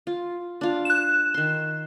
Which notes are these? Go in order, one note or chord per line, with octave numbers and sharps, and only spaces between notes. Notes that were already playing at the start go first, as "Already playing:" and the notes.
F4
D4 F4 F5
F#6 E7
D#3 C6